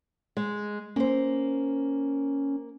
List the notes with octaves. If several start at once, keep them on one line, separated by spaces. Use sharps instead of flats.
G#3
A#3 C#4 C5